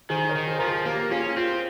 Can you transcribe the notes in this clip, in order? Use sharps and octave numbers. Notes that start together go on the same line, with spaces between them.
D#3 G#4 C5
A#4 C#5
D#3
G#4 C5
F3 A#4
G#4 C5
A#3 G4 A#4
C#4 F4 G#4
C4 F4